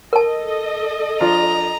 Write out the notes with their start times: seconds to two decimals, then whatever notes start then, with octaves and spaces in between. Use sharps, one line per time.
0.13 A4 A#4 D#5 A5
1.21 F3 D4 F4 A#5